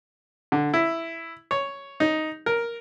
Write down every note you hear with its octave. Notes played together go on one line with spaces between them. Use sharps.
D3
E4
C#5
D#4
A#4